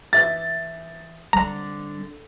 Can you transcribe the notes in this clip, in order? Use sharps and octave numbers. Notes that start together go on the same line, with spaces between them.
E3 E5 A6
D3 G3 C4 A#5